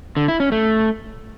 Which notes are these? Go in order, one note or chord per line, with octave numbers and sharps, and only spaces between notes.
D3
E4
C#4
A3